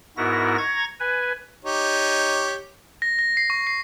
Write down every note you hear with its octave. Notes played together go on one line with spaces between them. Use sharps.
G#2 B3 E4 F#4 A#4 A#6
A#5 C#6 G#6 A#6
B4 G#5
D#4 G4 C#5
A#6
A#6
C7
C#6
C7